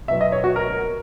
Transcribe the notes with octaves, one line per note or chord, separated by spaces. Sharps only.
B2 F#3 B3 E5
D#5
C#5
F#4
A#4